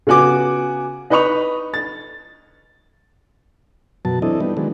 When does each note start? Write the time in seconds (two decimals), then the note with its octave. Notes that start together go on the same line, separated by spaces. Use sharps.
0.07 C#3 B3 F#4 G#5 D6
1.10 D#4 B4 D#5 B5 C#6 F7
1.74 A6
4.05 F#2 B2 F#3 A5
4.22 E3 C4 D4 E4 A4 D#5
4.40 G3 B3 D4 D#4
4.57 D#3 F#3 G#3 B3 D4